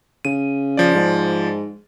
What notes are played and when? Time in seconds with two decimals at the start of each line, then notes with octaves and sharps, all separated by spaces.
0.25 C#3 D#7
0.77 F3 D5
0.95 G#2